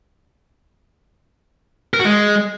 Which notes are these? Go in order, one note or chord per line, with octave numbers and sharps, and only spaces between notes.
A#4
F#4
G#3